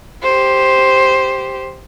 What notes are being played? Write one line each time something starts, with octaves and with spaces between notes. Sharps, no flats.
G4 C5